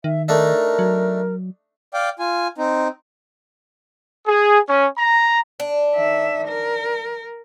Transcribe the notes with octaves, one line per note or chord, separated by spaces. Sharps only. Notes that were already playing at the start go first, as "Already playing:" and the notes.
D#3 E5
A3 D4 D#4 A#4
F#3
D5 F5 G5
F4 G#5
C4 D#4
G#4
C#4
A#5
D4
D#3 E5
A#4